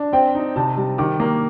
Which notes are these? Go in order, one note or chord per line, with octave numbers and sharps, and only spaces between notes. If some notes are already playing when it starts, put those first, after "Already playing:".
Already playing: D4
C4 G5
D#4
C3 A5
G3
D#3 D6
A#3